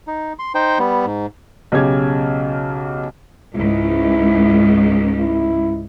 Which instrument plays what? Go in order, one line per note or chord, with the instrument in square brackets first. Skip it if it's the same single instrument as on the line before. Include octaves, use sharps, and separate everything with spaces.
[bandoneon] D#4
C6
D#4 C5 G5
G3 B3
G#2
[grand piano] B1 C#3 G4 G#6
[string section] C#2 G#2 [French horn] E4
[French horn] E4